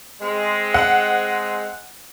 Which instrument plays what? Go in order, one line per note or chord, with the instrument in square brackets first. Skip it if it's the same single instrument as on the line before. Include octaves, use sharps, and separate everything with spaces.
[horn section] G#3 C4
[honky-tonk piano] F#5